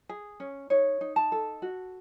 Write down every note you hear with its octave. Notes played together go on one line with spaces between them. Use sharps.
G#4
C#4
D#4 C#5
D#4
A5
A4
F#4